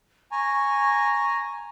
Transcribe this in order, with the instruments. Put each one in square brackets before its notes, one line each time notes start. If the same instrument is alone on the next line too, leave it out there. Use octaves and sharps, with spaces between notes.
[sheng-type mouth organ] G#5 A#5 [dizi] C#6